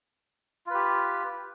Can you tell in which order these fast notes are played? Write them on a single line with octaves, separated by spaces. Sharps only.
F4 B4 G4